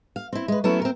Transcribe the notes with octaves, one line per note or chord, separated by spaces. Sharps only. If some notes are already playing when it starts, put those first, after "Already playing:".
F5
C4 E4
G#3 B4
F#3 A3 B3 C#4 E4
C4 A#4